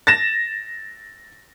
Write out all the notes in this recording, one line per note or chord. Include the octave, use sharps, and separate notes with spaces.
A6 A#6 E7